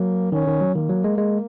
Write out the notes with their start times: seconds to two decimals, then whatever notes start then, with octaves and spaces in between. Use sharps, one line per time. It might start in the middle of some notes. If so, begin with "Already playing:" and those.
Already playing: F#3 A#3
0.32 D#3 C#4
0.47 D#3
0.61 F#3
0.75 D#3 A#3
0.89 F#3
1.04 G#3
1.18 G#3